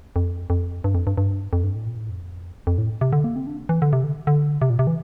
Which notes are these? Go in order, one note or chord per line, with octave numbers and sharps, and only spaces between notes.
F2
F2
G2
F2
G2
G2
F2
G2
A2
A#2
A2
F2
F2
A2
C3
D3
A#3
C4
D4
E3
D3
C3
D3
D3
C3
A#2
C3
E3